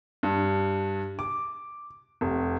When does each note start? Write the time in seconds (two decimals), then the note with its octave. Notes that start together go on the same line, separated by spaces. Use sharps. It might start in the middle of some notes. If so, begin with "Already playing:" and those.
0.23 G2
1.19 D6
2.21 F1